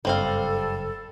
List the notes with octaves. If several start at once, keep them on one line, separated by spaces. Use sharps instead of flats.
F#1 G2 G3 C4 A4 F5